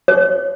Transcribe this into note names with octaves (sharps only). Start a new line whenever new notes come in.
C#5